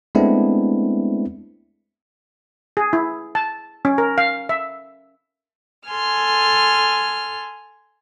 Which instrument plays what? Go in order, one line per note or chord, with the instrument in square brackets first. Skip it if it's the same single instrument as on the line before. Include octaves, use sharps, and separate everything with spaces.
[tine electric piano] G#3 A3 B3 C4 D4 E4
[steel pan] G#4
E4
A5
C#4
A#4
F5
E5
[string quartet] A4 G#5 C6 F6